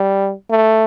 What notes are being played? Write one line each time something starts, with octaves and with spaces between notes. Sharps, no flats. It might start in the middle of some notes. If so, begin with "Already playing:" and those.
Already playing: G3
A3